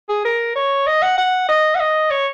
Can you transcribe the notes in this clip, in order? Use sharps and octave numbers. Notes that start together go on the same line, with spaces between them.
G#4
A#4
C#5
D#5
F#5
F#5
D#5
F#5
D#5
C#5